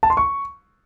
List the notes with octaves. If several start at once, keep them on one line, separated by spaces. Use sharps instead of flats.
A5
C6
C#6